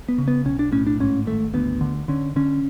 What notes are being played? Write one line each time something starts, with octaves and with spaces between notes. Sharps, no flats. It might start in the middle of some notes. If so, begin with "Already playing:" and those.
B3
C#3
B3
B1 C#4
D4
A2 C#4
D4
G#2 C#4
G#1 A3
D2 B3
D3
D3 C#4
D3 C#4